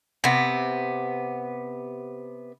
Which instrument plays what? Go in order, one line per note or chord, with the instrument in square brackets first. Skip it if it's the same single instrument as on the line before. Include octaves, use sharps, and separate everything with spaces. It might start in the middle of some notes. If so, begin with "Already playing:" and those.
[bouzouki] C3 B3